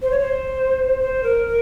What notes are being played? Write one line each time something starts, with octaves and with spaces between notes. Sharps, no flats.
C5
C#5
C5
C5
A#4
A#4